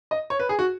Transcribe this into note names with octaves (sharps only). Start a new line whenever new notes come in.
D#5
C#5
B4
G#4
F#4